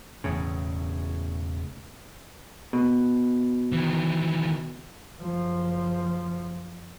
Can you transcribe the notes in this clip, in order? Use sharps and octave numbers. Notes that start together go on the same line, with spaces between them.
E1 E2 A2 C#3
B2
D#3 E3
F#1 F3